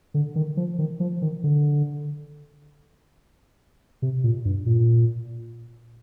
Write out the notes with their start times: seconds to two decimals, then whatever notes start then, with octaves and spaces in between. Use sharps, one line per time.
0.14 D3
0.36 D#3
0.57 F3
0.79 D#3
1.00 F3
1.22 D#3
1.44 D3
4.02 C3
4.24 A#2
4.45 G2
4.66 A#2